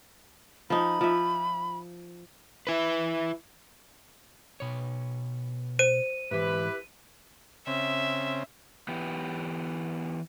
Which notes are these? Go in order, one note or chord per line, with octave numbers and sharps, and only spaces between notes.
F3 D#4 B5
F3 E5
E4 B4
B2 C#5
C5 D#7
G#2 E3 E4 G4 B4
C#3 C4 E5
E3 B3 G4